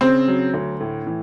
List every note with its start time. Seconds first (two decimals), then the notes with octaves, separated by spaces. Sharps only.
0.01 C#3 C4
0.28 F#3
0.54 D2
0.80 A2
1.07 E3